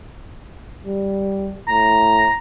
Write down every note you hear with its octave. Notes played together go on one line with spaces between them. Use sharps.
G3
A2 A#5